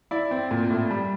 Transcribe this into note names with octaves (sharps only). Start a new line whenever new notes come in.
E4 D5
C4
A#2
A2
G3